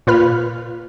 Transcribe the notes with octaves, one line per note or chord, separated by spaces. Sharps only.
A#2 F4 B4 B5 F6